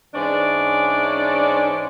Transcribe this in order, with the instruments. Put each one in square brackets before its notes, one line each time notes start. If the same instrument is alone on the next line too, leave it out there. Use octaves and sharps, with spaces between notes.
[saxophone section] G#2 E3 C#4 D4 D5